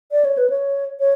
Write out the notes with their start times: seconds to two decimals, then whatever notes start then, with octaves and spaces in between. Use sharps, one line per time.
0.12 D5
0.25 C#5
0.38 B4
0.50 C#5
1.00 C#5